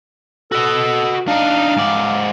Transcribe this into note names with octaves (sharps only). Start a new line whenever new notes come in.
F#4 A4 D#5
D4 D#4 F5
G#2 D5